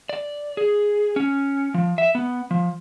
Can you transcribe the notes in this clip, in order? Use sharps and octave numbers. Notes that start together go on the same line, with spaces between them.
D5
G#4
C#4
F3
E5
B3
F3